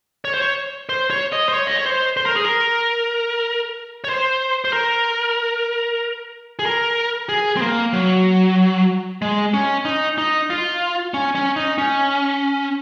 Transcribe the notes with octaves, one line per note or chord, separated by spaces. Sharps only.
C#5
C5
C#5
C5
C#5
D#5
C5
C#5
D#5
C#5
C5
C5
A#4
G#4
A#4
C#5
C5
C5
A#4
G#4
A#4
G#4
C4
A#3
F#3
G#3
C#4
D#4
D#4
F4
C#4
C#4
D#4
C#4